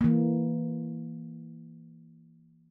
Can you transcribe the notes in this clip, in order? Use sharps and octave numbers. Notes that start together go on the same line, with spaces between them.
E3 A#3